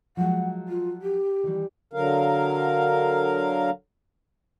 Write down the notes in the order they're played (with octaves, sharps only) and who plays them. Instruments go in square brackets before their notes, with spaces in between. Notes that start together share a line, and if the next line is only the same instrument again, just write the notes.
[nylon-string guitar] F3 F#3 G#3 [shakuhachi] F#5
[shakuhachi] F4
G4
[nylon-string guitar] D#3 E3 G3
[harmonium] D3 F#3 A#4 F5